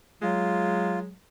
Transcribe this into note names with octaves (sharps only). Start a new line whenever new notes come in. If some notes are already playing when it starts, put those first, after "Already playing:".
F#3 G#3 F4